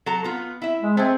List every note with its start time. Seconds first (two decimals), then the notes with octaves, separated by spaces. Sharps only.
0.06 F#3 A4 A#5
0.24 B3 F4 F#5
0.62 E4 E5
0.82 G#3
0.97 A3 C4 G#4